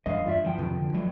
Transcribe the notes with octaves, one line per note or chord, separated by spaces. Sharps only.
E2 G2 E3 D#5 F5
G2 G3 F4 D5 E5
E2 E3 F3 G5
F2 C3 D#3
D3
F#3 A3